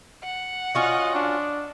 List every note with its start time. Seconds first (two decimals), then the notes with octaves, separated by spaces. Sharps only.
0.24 F#5
0.75 C#4 F4 F#4 D#5
1.14 D4